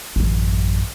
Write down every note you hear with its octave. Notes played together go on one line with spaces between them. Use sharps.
A1 F#2